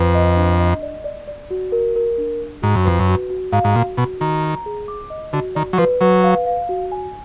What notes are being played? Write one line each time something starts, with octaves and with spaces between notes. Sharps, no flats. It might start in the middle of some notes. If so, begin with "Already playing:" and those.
Already playing: F2 B4
D#5
D4
D#5
D5
D5
D5
F#4
A#4
A#4
D4
D4
G#2 F#4
F#2
F2 B4
F#2
F#4
F#4
G#2 F5
G#2
A#2 F#4
B2 F#4
D#3 F#4
A#5
G#4
D6
D#5
D3 F#4
D#3 D5
F#3
F3 B4
F#3 B4
F5
F5
F#4
G#5